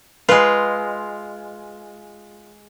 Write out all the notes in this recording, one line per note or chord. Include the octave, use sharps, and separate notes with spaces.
G#3 F4 B4